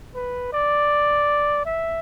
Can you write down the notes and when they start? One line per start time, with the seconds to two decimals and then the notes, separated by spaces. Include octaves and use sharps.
0.15 B4
0.53 D5
1.66 E5